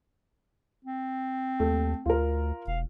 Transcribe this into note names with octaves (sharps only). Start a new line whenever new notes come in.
C4
D#2 A3
D2 F4 A#4
E1 F5